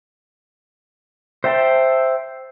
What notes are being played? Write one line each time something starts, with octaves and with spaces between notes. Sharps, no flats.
C5 E5 G5 A5